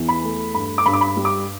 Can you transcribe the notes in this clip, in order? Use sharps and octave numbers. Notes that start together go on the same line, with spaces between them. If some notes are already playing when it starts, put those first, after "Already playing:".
Already playing: E2 E3
B5
A3
G2 B5
D6
G2 B5
D6
B5
G3
D6